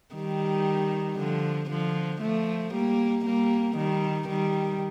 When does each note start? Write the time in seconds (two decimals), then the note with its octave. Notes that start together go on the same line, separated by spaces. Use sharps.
0.15 D#3 G3
1.18 D3 F3
1.70 D3 F3
2.22 F3 A3
2.74 G3 A#3
3.25 G3 A#3
3.77 D#3 G3
4.29 D#3 G3